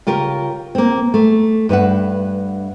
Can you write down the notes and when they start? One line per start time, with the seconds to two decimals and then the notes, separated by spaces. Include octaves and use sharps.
0.07 C#3 F4 G4 A#4
0.75 A#3 C4
1.14 A3
1.69 G2 B4 E5 F#5